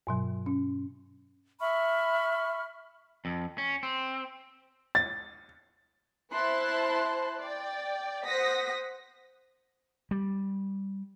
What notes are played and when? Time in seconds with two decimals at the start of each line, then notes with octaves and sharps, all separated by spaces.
0.07 G2 B2 F#3
0.46 C#4
1.60 E5 B5 C#6 F6
3.25 F2
3.58 C#4
3.83 C4
4.95 A6
6.33 E4 C5 A5 C6 F#6
7.39 D5 G5
8.24 C5 F#5 D#6 A#6 B6
10.11 G3